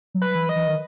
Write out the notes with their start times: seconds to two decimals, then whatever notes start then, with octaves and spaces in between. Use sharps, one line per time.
0.14 F#3
0.22 B4
0.35 E3
0.49 D#5
0.56 E3
0.67 D#3